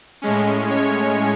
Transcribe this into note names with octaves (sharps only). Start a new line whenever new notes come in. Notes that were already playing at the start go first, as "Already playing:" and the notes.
A2 G#3 C#4
C#5